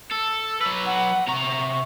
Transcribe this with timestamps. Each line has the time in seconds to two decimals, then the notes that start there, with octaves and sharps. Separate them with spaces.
0.11 A4 E6
0.61 F#3 B4
0.86 F#5
1.28 C3 A#5 C#6